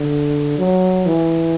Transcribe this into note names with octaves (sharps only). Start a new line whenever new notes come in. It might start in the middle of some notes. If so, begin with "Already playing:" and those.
Already playing: D3
F#3
E3